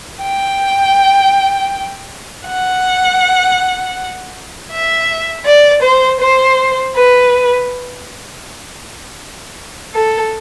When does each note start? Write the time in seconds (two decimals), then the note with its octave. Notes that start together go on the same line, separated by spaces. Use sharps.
0.21 G5
2.45 F#5
4.70 E5
5.45 D5
5.82 C5
6.20 C5
6.95 B4
9.94 A4